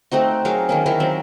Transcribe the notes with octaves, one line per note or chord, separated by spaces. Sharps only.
A3 C4 D#4 F#4
F#3 G#4 A#4 F5
D#3 A#3 C#4
D#3 E4 A#4 C#5
F#3 C4